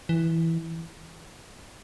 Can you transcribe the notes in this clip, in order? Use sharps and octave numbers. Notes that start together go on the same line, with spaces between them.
E3